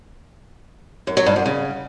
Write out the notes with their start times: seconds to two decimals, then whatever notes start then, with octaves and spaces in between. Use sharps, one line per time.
1.07 F#2
1.17 F#3
1.26 G2
1.36 F#2
1.46 C#3